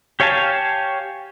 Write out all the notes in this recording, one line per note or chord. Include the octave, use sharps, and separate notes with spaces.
G4 C#5 F5 G#5 A5